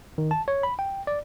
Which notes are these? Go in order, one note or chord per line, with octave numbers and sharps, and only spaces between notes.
D#3
A5
C#5
B5
G5
D5